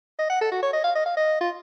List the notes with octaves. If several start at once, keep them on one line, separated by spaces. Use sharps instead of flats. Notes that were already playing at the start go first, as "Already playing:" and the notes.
D#5
F#5
A4
F#4
C#5
D#5
F5
D#5
F5
D#5
F4